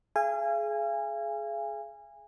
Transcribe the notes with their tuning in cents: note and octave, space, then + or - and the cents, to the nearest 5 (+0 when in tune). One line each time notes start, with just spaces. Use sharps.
G#4 +25 F5 -40 G#5 -20